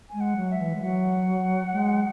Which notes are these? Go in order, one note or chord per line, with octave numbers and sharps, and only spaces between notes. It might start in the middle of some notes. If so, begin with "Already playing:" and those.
G#3 G#5
F#5
F#3
E5
E3
G#3
F#3 F#5
G#3